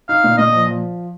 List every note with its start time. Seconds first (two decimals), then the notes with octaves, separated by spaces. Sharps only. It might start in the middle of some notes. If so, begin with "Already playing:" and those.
0.09 D#4 F5
0.24 A#2
0.38 A#2 D#5
0.53 F3
0.67 F3